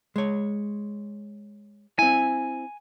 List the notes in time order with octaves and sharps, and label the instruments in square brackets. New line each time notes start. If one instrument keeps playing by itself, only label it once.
[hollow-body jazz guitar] G#3 C#5
[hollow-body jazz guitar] C4 E4 [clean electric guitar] G#5